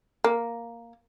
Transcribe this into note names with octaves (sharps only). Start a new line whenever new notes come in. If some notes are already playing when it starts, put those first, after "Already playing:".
A#3